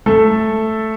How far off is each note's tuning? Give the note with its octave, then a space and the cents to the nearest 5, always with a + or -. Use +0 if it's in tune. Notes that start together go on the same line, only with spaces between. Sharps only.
A3 +0 A4 +0